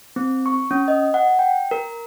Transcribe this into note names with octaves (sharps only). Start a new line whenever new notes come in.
C4
C#6
C#4
D#5
F#5
G5
A#4